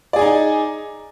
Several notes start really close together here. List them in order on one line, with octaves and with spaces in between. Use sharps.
D5 G#4 G#5 D#4